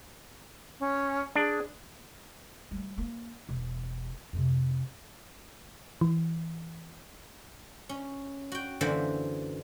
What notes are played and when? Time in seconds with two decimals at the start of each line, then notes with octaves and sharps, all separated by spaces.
0.80 C#4
1.36 D4 G#4
2.71 G3 A3
2.98 A#3
3.49 E1
4.33 F2 C3
6.01 E3
7.89 C#4
8.52 F#4 G5
8.81 F#2 D3 E3 A#3 C5 E5